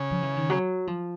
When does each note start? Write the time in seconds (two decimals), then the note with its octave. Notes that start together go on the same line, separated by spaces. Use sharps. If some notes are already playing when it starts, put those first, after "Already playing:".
Already playing: C#3
0.11 F3
0.23 E3
0.37 D#3
0.50 F#3
0.87 F3